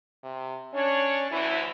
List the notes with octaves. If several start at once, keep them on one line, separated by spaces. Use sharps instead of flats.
C3
C#4 D4 C#5
D2 E3 E4